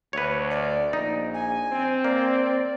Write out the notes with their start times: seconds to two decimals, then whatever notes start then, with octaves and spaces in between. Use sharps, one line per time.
0.13 D2 B4 C#5
0.51 D5
0.93 A#1 D#4
1.34 G#5
1.72 C4
2.04 A#3 D5